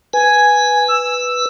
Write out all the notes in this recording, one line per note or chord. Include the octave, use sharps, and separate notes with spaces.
B4 G#5
E6